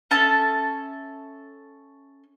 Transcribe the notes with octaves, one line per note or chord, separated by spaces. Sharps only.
C#4 A4 E5 A5